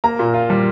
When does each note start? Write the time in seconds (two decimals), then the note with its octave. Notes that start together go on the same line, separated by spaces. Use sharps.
0.04 A#3 A#5
0.19 A#2
0.34 F4
0.50 G3